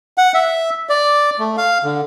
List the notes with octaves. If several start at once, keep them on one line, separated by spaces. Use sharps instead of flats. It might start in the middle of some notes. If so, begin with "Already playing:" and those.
F#5
E5
D5
A3
F5
D3